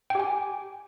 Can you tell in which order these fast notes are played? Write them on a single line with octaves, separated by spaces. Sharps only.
G5 G4 G#5